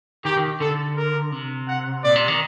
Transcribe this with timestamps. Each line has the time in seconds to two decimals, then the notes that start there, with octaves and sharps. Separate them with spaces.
0.25 D#3 G4
0.37 D#3
0.60 D3 A4
0.97 A#4
1.32 C3
1.68 F#5
2.04 A#2 D5
2.16 C3
2.28 D#3